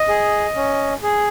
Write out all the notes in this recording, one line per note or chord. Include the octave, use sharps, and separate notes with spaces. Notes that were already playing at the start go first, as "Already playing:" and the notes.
Already playing: D#5
G#4
C#4
G#4